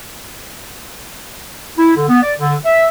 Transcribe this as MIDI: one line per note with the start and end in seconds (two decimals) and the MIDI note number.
1.78 1.95 64
1.96 2.09 50
2.09 2.19 59
2.22 2.33 74
2.39 2.55 50
2.66 2.89 76